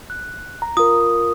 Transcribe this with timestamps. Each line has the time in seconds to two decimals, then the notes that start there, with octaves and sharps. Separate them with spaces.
0.10 F#6
0.62 A#5
0.77 F4 A#4 D#6